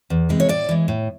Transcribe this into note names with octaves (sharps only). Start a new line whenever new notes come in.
E2
C3 E3 G#3
C#5
A2 D5
E3 G#3
A2